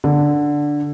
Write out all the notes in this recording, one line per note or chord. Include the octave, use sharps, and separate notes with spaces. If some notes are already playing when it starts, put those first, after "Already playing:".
D3